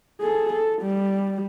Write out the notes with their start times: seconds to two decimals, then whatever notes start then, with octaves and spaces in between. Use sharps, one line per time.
0.21 G#4 A4
0.52 A4
0.82 G3